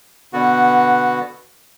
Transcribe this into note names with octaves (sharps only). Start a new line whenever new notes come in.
B2 D3 B3 F#4